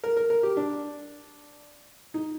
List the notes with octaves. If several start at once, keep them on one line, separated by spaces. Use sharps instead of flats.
A#4
A#4
A#4
G4
D4
D#4